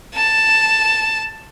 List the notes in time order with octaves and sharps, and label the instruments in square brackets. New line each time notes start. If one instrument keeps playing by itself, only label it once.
[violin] A5